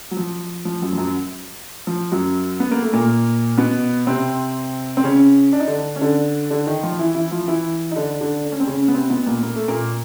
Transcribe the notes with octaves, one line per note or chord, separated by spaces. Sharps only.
F#3
F3
F3
F#2 F#3
F3
F#2 F#3
F3
F#2 F#3
B3
A#3
A3
A#2 A#3
B2 B3
C3 C4
C4
C#3 C#4
D4
D#4
D3 D4
C#4
D3 D4
D3 D4
D#3 D#4
F3 F4
E3 E4
E3 E4
F3 F4
E3 E4
D#4
D3 D4
D3 D4
D4
C#4
C4
C#3 C#4
B3
C3 C4
B2 B3
A#2 A#3
A#3
A3
A#2 A#3